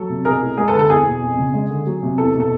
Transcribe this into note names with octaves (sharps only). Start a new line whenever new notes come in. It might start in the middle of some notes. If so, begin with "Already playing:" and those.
Already playing: F#3 A4
C3
B1 G#4 A#4
A2
G#3 G#4 A#4
A4 B4
D3
A4
E2 G#4
B2
F2
C#3
G#3
D3
F#3
C3
E2 A4
B2
A4